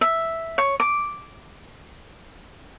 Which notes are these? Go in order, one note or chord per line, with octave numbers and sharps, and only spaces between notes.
E5
C#5
D6